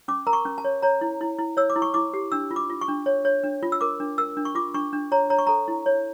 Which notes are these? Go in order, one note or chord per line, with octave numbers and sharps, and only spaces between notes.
C#4 D6
A#4 A#5
C#6
C#4
A5
C#5
C#5 A#5
E4
E4
E4
C#5 E6
D6
E4
C#6
E4 D6
G4
D4 E6
F4
D6
F4
C#6
D4
C#5
C#5
D4
F4
E6
A#4 D6
D4
A#4 E6
D4
C#6
F4 D6
D4 C#6
D4
C#5 A#5
C#5 A#5
C#6
A4 A#5
E4
C#5